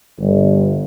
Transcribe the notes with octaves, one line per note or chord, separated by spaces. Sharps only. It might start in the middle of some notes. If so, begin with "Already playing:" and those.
G1